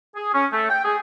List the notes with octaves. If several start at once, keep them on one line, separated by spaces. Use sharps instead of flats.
G#4
C#4
A3
G5
G#4